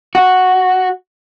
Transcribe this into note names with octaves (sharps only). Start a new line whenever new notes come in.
F#4